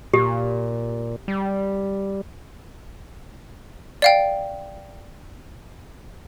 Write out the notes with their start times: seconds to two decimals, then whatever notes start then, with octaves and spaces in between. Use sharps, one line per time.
0.14 A#2 G4
1.28 G3
4.02 D5 F5 G5